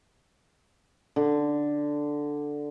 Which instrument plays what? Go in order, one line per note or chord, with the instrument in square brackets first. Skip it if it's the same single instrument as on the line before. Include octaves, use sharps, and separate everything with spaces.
[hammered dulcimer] D3